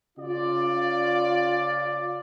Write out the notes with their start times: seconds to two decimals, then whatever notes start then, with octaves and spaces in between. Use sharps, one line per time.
0.18 C#3 F4 D5